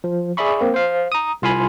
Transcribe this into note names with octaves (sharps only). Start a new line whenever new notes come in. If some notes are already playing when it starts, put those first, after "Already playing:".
F3
G#4 D5 E5 B5 C#6
A#3 C4
C5 F5
A#5 D#6
C2 F4 F5 G#5 B5 C6